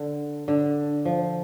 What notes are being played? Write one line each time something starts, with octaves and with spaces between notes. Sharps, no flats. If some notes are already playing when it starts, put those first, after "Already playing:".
Already playing: D3
D3
F3